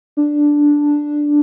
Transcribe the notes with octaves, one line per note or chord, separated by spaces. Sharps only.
D4